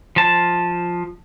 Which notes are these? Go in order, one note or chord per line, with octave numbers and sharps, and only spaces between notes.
F3 A5